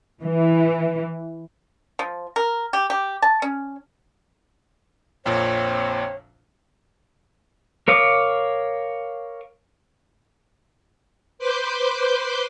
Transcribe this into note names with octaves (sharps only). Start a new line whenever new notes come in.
E3
F3
A#4
G4
G4
A5
C#4
A#1 F2 A#2 C4 C#5
A#4 C#5 F5 D6 D#6
B4 C5 C6 D6 G6